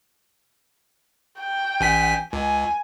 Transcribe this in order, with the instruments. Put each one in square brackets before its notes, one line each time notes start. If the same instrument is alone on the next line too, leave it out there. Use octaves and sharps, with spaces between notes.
[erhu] G5
[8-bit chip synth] A1 G#5 B6
[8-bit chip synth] C#2 [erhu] G#5